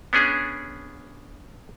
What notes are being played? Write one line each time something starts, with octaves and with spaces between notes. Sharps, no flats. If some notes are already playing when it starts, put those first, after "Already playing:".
B3 C#4 D4 G#4